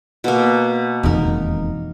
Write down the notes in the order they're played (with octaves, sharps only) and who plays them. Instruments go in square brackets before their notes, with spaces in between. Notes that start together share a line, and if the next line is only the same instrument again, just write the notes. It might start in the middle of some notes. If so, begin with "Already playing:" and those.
[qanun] B2 A#3
[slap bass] E1 F2 D#3 [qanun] D#4 A#4